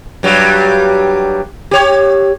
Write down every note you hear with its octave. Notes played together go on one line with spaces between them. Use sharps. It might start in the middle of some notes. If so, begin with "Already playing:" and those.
G2 F#3 G3
G4 C#5